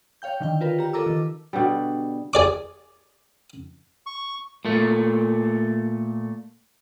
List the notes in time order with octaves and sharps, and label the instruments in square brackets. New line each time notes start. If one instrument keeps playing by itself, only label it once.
[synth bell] C#5 F5 G5 G6
D3 D#3 G5
F4 A#4 B4
G4 A#5
F4 A4 A#4 A#5 D6 E6
D#3
[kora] B2 D3 G3
[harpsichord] G#4 D5 D6
[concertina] C#6
[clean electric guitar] A#2 A3